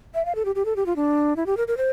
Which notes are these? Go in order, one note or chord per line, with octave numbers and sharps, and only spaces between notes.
E5
F5
A4
G4
G4
A4
G4
F4
D4
E4
G4
A#4
A#4
C5